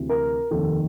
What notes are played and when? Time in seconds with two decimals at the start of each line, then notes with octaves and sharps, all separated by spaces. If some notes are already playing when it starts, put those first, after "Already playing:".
Already playing: D2 C3 E3
0.09 A#4
0.51 F1 D#2 D#3 A4